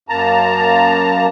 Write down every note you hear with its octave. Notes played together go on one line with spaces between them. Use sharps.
F#2 A#3 A5 A#5